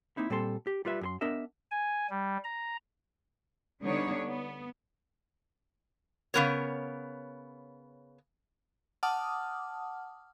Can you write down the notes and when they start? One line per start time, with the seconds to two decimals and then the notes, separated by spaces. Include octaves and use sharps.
0.17 A#3 C4 D#4 E4
0.30 A#2 G3 C4 A4 C6
0.67 G4
0.85 G3 F4 B4 E5
1.01 F#2 G#4 C6
1.21 B3 D4 A#4 D#5 E5
1.71 G#5
2.10 G3
2.44 A#5
3.82 D3 G3 B3 D4 D#4 C#5
4.24 B3
6.34 C#3 F3 B3 A#4 C#5
9.03 F#5 A5 D6 D#6 F6